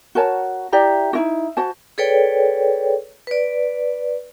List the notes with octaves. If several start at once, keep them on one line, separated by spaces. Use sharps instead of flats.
F#4 A#4 C#5 A5
E4 G4 D5 A#5
D#4 E4 F#4
F#4 C5 A5
G#4 A4 B4 C#5 D5 G5
B4 D5